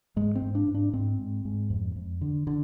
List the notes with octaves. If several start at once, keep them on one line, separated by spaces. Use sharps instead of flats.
G#2 G#3
C4
G#2
D4
G#2
D4
G#2 C4
G#2
G#2
F2
F2
D3
D3